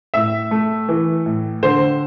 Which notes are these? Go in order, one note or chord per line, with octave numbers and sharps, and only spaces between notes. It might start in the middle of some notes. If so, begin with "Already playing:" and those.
A2 E5
A3
E3
A2
D3 C5